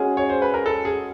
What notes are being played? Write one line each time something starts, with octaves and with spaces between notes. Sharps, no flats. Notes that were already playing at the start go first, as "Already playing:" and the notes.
Already playing: G#3 C#4 F#4 G#4
C#5
C5
B4
A#4
A4
G#4